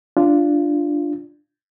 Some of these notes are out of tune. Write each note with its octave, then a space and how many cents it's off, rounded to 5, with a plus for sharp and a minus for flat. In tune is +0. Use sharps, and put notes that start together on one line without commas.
D4 +0 F4 -15